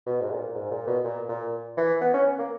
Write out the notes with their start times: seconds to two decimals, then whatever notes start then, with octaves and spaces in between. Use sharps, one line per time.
0.07 B2
0.21 G#2
0.31 A#2
0.55 G#2
0.71 A#2
0.87 B2
1.04 A#2
1.29 A#2
1.77 E3
2.01 B3
2.14 C#4
2.39 A#3